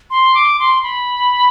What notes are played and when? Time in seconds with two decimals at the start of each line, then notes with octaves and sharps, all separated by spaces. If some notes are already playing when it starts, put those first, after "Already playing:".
0.10 C6
0.35 D6
0.59 C6
0.83 B5